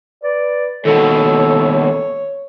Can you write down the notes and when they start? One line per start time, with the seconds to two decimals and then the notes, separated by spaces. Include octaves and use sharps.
0.23 B4 D5
0.85 D#2 B2 A4 C#5